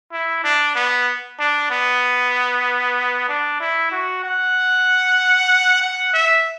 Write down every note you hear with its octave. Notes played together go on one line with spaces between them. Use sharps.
E4
D4
B3
D4
B3
D4
E4
F#4
F#5
F#5
E5